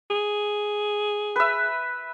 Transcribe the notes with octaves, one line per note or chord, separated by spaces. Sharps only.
G#4
B4 E5